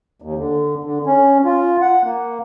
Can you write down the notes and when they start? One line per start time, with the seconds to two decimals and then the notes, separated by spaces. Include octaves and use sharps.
0.22 D#2
0.38 D3
0.84 D3
1.06 C#4
1.45 F4
1.81 F#5
2.04 A#3